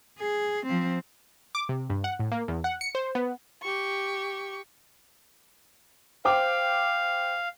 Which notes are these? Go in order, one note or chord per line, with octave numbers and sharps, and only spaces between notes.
G#4
F3 C4
D6
C3
G2
F#5
A2
A#3
E2
F#5
C#7
C5
B3
G4 C#6
C5 F5 G5 D6